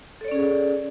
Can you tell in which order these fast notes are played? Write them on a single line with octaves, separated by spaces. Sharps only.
A4 C#5 D5 C#4 G#4